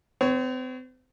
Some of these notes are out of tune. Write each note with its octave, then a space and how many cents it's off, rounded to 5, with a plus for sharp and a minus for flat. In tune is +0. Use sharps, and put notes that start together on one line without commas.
C4 -40 C#5 +0